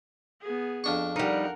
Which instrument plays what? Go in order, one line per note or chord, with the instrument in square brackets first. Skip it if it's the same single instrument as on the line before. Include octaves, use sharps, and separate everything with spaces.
[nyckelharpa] B3 G#4
[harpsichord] F2 D4 C#6
[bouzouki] G3 D#4 [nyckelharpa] A#4 F#5